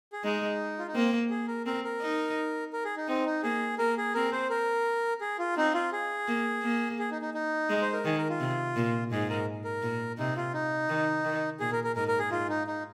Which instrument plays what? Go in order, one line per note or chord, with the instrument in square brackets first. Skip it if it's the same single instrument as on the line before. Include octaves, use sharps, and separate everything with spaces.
[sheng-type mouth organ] G#4
[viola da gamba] G#3 [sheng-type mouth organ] D#4
[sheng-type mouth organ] F4
D#4
[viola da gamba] A#3 [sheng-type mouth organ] C4
[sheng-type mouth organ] G#4
A#4
[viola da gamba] C4 [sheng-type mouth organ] A#4
[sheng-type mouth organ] A#4
[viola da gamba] D#4
[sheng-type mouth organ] A#4
G#4
D#4
[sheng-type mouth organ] C4 [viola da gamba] D#4
[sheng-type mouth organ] D#4
[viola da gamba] A#3 [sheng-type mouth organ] G#4
[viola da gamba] A#3 [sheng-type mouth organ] A#4
[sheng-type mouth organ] G#4
[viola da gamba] C4 [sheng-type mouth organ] A#4
[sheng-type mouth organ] C5
A#4
G#4
F4
[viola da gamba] C4 [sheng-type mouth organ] D#4
[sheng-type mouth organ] F4
G#4
[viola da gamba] A#3
A#3
[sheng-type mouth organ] G#4
D#4
D#4
D#4
[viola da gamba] G#3
[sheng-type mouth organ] C5
A#4
[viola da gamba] D#3 [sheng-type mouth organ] G#4
[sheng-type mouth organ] A#4
F4
[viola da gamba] C3
A#2
[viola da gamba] G#2 [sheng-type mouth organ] G#4
[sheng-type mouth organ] A#4
A#4
[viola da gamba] A#2
[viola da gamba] C3 [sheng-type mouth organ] D#4
[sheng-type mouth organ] F4
D#4
[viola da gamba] D#3
D#3
[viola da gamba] A#2 [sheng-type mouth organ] G#4
[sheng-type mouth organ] A#4
A#4
[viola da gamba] G#2 [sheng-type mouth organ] A#4
[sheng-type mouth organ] A#4
G#4
[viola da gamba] G#2 [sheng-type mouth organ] F4
[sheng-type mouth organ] D#4
D#4